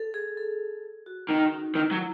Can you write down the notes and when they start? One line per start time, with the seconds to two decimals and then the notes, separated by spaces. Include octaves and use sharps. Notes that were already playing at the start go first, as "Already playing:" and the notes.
Already playing: A4
0.14 G#4
0.37 A4
1.06 F#4
1.30 D#3 D#4
1.53 C#4
1.75 D#3 E4
1.91 F#3